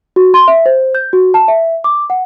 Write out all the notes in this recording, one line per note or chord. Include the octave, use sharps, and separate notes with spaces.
F#4
C6
E5
C5
G6
F#4
A5
E5
D6
F#5